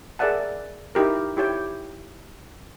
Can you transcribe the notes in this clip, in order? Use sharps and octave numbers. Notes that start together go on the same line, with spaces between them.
G#4 A#4 D5 E5 F#5 A5
D#4 E4 G4 A#4
E4 G4 C#5 G5